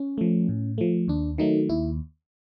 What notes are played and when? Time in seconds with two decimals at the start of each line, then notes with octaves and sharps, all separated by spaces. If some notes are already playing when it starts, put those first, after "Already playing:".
Already playing: C#4
0.18 F3 A3
0.49 A2
0.78 F3 A3
1.08 D#2 D4
1.38 D#3 F#3 A3 D#4
1.69 D#2 E4